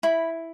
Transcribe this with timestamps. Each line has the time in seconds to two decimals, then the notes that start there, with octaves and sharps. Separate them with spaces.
0.03 E4 B5